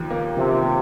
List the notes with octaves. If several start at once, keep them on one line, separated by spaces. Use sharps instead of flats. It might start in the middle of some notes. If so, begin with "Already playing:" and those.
Already playing: D#2 F3
A#3
C3 F3
A#3